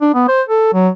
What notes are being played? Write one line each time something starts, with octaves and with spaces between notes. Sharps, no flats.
D4
B3
C5
A4
F#3